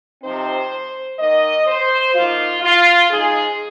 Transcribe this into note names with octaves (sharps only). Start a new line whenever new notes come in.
C3 F3 C4 D#4 C5
D#3 A#3 D#4 D#5
C5
F3 A#3 D#4 F4
F4
F3 G#3 D#4 G#4